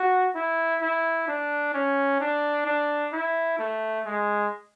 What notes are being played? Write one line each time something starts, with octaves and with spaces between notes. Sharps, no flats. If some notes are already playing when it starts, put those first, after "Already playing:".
Already playing: F#4
E4
E4
D4
C#4
D4
D4
E4
A3
G#3